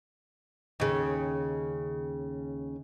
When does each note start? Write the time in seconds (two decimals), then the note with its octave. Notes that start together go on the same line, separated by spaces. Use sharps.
0.80 D#2 C#3